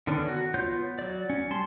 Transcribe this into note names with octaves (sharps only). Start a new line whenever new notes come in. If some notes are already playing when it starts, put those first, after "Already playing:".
D3 D#3 B3 C#4 D4
F#4
B3 F4 C#5 G6
F#3 D5
C#4
G3 A5 C6